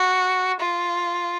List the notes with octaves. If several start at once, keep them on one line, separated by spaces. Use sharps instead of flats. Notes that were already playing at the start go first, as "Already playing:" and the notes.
Already playing: F#4
F4